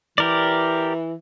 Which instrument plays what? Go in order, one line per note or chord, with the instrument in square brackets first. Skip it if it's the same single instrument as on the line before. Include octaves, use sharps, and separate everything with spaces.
[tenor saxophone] E3 [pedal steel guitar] G4 A#4 D5